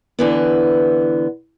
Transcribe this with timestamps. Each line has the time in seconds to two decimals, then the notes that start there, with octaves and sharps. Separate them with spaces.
0.19 D3 E3 B3